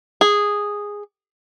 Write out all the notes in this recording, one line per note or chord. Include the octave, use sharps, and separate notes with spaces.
G#4